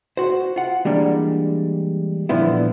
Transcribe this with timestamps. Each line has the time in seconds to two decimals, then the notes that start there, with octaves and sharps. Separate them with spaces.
0.17 F#4 C5
0.56 F4 F#5
0.85 E3 G3 G#3 A#3 D4
2.29 A#2 D3 F3 B3 E4